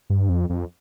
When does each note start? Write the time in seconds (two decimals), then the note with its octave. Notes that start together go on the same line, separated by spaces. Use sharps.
0.10 G2
0.29 F2
0.50 F2